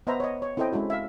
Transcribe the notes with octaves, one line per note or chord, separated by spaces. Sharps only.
B3 B4 C5 D#5 E5 A#5
C#5 D#5
C#5
C4 E4 A4 C5 D#5 G5
G#3 C#4 E4 F#4
E5 F5